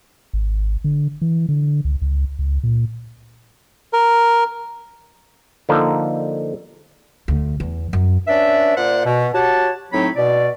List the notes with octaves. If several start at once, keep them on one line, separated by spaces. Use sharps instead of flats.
G#1
D3
E3
D3
C#2
C#2
C#2
A#2
A#4
D3 F3 A#3 D#4 A4
D2
E2
F#2
C#4 D4 B4 D5 E5
A#2 C5 D5 F#5
B2
F#4 G4 C#5 F#5 A5
A2 F#3 C4 D#4 C#5 B5
B2 D5